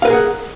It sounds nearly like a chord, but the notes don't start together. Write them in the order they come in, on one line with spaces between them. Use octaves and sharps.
F5 B4 A#4 G#4 F#5